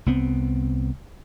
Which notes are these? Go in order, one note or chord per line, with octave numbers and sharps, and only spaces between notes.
C2 B3 C4